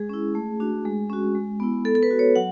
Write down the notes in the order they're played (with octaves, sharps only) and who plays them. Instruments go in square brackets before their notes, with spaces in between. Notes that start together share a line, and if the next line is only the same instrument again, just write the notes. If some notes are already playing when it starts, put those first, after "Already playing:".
Already playing: [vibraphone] G#3 G#4
C#4 E4
A3
D4 F#4
G#3
C#4 F#4
G#3
B3 E4
B3 A4
A4
B4
F#4
C#5
F#3 F#5